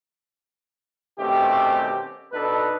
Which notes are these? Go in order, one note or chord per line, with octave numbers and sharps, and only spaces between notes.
B2 D#3 A3 C4 C#4 G4
B2 D4 D#4 A4 B4